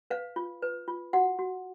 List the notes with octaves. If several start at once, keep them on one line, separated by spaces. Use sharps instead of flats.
B4 F5
F4
B4
F4
F#4 F#5
F#4